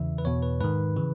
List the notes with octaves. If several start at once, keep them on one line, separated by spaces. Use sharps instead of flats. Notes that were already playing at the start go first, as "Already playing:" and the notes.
Already playing: E2 C#3 E3 E5
B4
E2 B2 C#5
B4
G#2 D#3 B4
C#3 E3